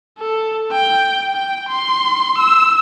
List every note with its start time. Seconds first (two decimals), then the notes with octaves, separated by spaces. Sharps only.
0.18 A4
0.72 G5
1.33 G5
1.69 C6
2.38 E6